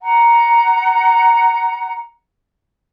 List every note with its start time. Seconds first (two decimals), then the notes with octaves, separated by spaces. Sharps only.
0.02 F#5 A#5